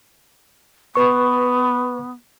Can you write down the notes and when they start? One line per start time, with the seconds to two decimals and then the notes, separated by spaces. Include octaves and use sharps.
0.95 B3 B4 C#6